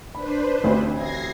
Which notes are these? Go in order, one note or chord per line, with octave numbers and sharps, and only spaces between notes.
D4 B4 C5 B5
A1 D2 C4
G#6 A#6 C7